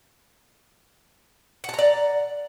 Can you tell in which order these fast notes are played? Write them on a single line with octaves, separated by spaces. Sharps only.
F#5 A5 A#5 D5